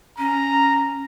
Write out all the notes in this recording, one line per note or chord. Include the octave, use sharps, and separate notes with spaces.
C#4 A#5